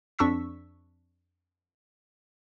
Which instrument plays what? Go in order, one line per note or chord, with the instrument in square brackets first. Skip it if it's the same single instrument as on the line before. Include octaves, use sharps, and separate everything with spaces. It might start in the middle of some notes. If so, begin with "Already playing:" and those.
[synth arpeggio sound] F2 D4 C#6 E6 B6